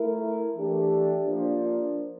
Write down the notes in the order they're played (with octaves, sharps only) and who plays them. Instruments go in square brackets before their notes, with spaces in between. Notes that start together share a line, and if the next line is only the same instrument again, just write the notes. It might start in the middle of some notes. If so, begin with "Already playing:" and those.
Already playing: [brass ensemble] A3 E4 A#4
E3 A3 D4 G4
F3 A#3 D4